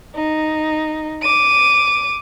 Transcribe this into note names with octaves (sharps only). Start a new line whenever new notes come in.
D#4
D6 D#7